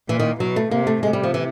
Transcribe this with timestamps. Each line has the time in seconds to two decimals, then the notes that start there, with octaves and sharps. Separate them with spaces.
0.09 A#2 E3
0.19 D#3
0.40 B2 F#3
0.56 A3
0.71 C3 A#3
0.87 A3
1.03 C3 G#3
1.13 G3
1.23 F3
1.34 E3